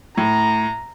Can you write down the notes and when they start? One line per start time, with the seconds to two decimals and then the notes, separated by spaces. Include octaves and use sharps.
0.17 A2 A#5